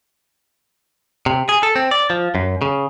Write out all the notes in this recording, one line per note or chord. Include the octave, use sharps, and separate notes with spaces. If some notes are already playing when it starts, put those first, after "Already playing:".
C3
G#4
A4
C4
D5
F3
F#2
C#3